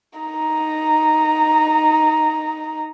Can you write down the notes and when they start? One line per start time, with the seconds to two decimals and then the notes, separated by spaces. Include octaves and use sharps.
0.19 D#4 A#5